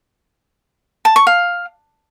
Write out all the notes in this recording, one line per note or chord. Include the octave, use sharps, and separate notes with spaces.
A5
C#6
F5